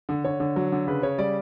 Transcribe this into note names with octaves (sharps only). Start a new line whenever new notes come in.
D3
D3 C#5
D3
F#3
D3
C#3 B4
C#3 C#5
G3 D5